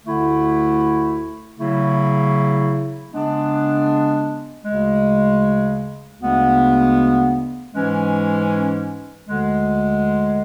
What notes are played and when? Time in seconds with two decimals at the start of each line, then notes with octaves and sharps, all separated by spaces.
0.04 D2 D3 A3 E4
1.58 C#3 F#3 A3 E4
3.12 C#3 G#3 B3 D4
4.65 D2 C#3 G#3
6.20 D2 C#3 G#3 B3 D4
7.73 G#2 E3 G#3 C#4
9.27 D2 D3 G#3